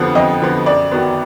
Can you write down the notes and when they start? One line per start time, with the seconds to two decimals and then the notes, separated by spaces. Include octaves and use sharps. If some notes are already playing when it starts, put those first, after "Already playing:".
Already playing: F2 D3 F3 B3 F#5
0.15 F2 D#5
0.41 D3 F3 B3
0.66 F#2 D5
0.92 D#3 F#3 B3